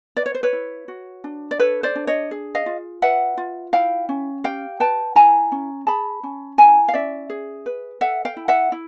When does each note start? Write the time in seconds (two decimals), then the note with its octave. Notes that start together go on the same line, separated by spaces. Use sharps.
0.17 B4 D5
0.26 C#5
0.35 C5
0.43 B4 C#5
0.53 E4
0.88 F#4
1.24 D4
1.51 D5
1.60 A4 B4 C#5
1.83 C5 D5
1.95 D4
2.07 C#5 D#5
2.31 G#4
2.55 D#5 F5
2.66 F4
3.02 B4 E5 F#5
3.37 F4
3.73 E4 F5 G5
4.09 C#4
4.44 G4 F5 G5
4.80 B4 G5 A5
5.15 E4 G#5 A#5
5.52 C#4
5.87 G#4 A5 B5
6.23 C#4
6.58 E4 G#5 A#5
6.88 F5
6.94 C#4 D5 E5
7.30 G#4
7.66 B4
8.01 A4 E5 F#5
8.25 F5 G5
8.37 E4
8.48 E5 F#5
8.72 E4